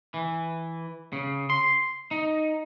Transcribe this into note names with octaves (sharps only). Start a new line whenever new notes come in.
E3
C#3
C6
D#4